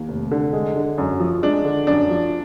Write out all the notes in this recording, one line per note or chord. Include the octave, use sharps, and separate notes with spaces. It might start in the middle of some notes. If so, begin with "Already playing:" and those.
Already playing: D#2
F1
D3
G#3
D3
F#2
F3
G#3 D4
D3
F#2 D4
F3